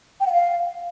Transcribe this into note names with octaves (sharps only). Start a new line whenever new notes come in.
G5
F#5
F5